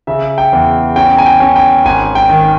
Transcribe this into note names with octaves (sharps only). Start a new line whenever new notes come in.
C#3 E5
G5
E2
C#4 G5
G#5
G5
C#4
G5
G#1 G#5
G5
D#3